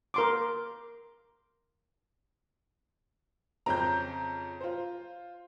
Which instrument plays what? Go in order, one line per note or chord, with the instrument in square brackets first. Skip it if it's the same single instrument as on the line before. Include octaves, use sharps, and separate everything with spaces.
[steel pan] A#4 C6 D6
[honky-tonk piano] F2 C#3 C4 [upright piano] A#5 G6
[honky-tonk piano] F4 C5